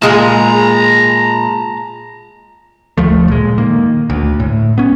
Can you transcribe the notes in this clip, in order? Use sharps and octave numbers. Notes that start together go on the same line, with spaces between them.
A#2 G#3 G#4 A5 A#5
F#1 D2 F3 A3
A#2 G#3
D#3 A#3
D2
A2
B3 C#4